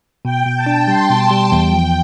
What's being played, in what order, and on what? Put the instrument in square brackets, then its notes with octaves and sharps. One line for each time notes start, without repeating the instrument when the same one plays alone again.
[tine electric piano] B2 [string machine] G5
[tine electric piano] B2
[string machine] A5
[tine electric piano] D4
[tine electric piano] G3 [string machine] C6
[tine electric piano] B2
G3
[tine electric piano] E2 [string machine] G5
[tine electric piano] F3